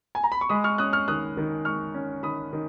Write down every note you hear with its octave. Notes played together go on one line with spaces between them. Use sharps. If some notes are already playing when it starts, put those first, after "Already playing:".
G#5
A#5
B5
C#6
G#3 B5 D#6
C#6 F6
C#4 D#6 F#6
C#6 F6
D#3 D#6 F#6
D#3
G#3 C#6 F6
C#4
D#3 B5 D#6
D#3